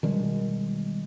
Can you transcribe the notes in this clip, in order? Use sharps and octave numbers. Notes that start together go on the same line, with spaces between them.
B2 D#3 G3 G#3